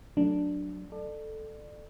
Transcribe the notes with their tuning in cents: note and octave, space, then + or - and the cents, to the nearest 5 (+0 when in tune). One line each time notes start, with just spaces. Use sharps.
F#3 +0 A3 +10 D4 +0
A4 +0 D5 +30